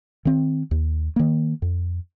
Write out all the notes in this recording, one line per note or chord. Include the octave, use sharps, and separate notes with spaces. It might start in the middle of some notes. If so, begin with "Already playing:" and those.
D#3 C4
D#2
D#3 A#3
F2